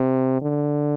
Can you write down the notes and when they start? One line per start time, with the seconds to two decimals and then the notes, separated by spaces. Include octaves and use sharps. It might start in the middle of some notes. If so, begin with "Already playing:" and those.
Already playing: C3
0.42 D3